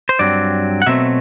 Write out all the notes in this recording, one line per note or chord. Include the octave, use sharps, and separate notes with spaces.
C5
G2 F#3 C4 D5
F#5
B2 F#3 A3 C4 E5